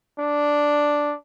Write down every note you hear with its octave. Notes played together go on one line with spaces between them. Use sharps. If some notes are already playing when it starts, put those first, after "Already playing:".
D4